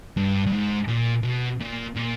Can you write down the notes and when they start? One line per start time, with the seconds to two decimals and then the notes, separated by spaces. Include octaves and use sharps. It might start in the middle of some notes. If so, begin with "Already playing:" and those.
0.17 G2
0.47 G2
0.53 G#2
0.88 A#2
1.23 B2
1.60 A#2
1.96 A#2